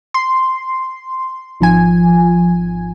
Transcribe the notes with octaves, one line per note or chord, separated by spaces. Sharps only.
C6
G#1 F3 G#5